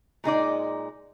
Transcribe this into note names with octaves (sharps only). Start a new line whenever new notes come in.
A#2 G#3 D#4 D5